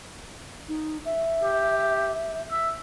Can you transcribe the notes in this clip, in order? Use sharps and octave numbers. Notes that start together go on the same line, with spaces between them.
D#4
E5
G4
E5